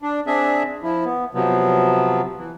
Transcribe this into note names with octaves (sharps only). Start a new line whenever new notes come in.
D4
C4 D4 G#4 E5
F3 E4
B3
C3 F3 F#3 B3
E3